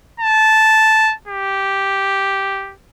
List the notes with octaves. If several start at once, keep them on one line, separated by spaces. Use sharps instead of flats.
A5
G4